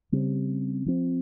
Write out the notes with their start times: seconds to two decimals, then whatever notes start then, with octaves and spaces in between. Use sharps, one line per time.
0.12 C#3 G3 C4
0.86 F3 C4